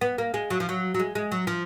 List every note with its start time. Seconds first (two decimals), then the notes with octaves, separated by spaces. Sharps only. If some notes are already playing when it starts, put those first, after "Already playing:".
0.01 B3
0.18 A#3
0.34 G#3
0.50 F#3
0.60 F3
0.69 F#3
0.94 F#3
0.99 G#3
1.15 G#3
1.32 F#3
1.47 F3